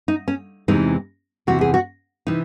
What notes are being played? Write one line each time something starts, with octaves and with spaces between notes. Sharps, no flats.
D#4
C#4
E2 C3 E3 G#3 C4 D#4
E2 C3 E3 F#4
G#4
F#4
C3 E3 D#4